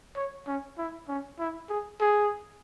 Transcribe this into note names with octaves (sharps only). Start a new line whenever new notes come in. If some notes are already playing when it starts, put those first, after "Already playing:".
C#5
C#4
E4
C#4
E4
G#4
G#4